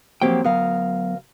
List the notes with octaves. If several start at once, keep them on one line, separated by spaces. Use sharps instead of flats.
F3 F#3 A#3 C4 G4 G5
D2 F#3 B3 A#4 F5